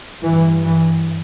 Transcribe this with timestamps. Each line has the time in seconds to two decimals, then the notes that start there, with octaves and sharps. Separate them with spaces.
0.23 G2 E3
0.64 E3